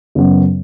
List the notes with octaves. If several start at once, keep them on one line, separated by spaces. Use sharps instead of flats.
F#2 C#3 F#3 B3 F#4